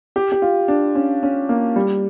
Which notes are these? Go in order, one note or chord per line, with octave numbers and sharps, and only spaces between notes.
G4
G4
F4
D4
C#4
C#4
A#3
G3